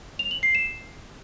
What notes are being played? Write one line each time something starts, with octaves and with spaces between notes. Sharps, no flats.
F7
F#7
C7
E7